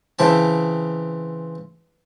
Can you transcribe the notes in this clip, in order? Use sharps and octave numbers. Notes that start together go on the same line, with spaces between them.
C#3 E3 C4 A5